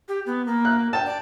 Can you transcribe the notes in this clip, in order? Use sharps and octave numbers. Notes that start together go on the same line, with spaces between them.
G4
B3
A#3
F#6
G5 A5
D5